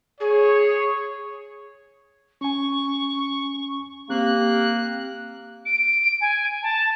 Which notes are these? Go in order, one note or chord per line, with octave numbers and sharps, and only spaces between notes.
G#4 C#5
C#4 G#5 C#6
A#3 C4 G4 F#6
D7
G#5
A5